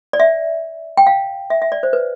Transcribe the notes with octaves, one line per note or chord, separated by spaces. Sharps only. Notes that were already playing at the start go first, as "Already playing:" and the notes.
D5
E5
G5
F5
E5
E5
D5
C5
B4